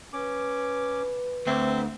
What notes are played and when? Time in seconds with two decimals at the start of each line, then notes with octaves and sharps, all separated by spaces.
0.13 C#4 B4 D6
1.47 D2 C4 E5